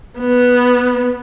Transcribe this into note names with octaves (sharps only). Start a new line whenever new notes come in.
B3